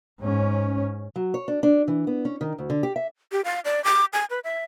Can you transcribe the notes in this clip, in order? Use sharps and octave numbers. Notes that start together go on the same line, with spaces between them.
G#2 C#4
F#3
C#5
D4
D4
E3
B3
C#4
D#3
D2
D3
G4
E5
G4
F5
D5
D6
G#5
B4
E5